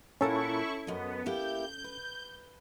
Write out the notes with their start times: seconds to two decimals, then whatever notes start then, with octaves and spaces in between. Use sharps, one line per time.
0.21 A#2 C#4 E4 A4 A#4 F#5 A5 C#6
0.87 F#2 B3 D#5
1.26 A#3 E4 G4 G6
1.84 B4